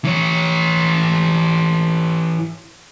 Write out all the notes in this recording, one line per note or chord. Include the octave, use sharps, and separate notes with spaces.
E3 C#5